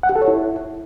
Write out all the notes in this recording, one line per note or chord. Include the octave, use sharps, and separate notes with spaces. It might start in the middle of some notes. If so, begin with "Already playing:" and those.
F#5
G4
A4
C#5
E4